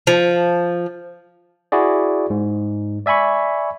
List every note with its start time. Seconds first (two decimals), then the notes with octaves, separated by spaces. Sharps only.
0.07 F3
1.72 E4 F#4 G#4 D5
2.30 G#2
3.06 D5 E5 G#5 B5 C#6